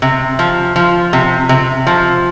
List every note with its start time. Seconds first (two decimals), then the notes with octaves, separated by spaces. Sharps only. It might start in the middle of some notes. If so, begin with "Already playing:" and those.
0.02 C3
0.39 F3
0.76 F3
1.13 C3
1.49 C3
1.87 F3